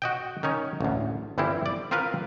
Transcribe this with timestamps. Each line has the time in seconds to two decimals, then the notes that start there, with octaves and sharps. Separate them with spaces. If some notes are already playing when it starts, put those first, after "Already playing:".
0.02 F#4 D#5 G5
0.43 D#3 C#4 D#4 C#5
0.81 A1 D2
1.38 G1 E3 G3 C4 E4
1.66 D5
1.91 C4 F4 A#4 B4 F5